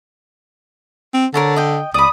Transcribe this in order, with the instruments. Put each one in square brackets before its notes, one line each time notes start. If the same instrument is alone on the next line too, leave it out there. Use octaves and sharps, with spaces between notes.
[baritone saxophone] C4
[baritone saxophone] D3 [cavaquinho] A#4 C#5 A5
[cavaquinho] D#5 G5
[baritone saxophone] C#2 [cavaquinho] D5 B5 [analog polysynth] D#6